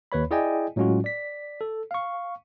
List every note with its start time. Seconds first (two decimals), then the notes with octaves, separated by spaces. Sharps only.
0.12 D#2 B4 C#5 B5
0.31 E4 G#4 D5 D#5 G5 G#5
0.76 A2 F#3 G#3 C#4 F4 F#4
1.04 D5 B6
1.61 A4
1.91 F5 C#6